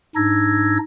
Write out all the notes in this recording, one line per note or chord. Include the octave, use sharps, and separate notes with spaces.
G#2 D4 D#4 E6 G#6 A#6